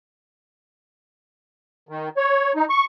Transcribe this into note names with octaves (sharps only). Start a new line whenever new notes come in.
D#3
C#5
D#4
C#6